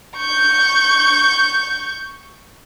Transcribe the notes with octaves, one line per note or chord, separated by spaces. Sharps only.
C#6 G6